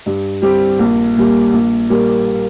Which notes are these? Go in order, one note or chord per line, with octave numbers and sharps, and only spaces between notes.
G2
G3 C4 G4
A#1
A#2 G3
A#1
A#2 G3 A#3